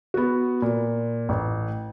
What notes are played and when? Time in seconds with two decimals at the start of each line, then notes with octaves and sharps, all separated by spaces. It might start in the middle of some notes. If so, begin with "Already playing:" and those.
0.14 B3 F#4
0.62 A#2
1.29 A1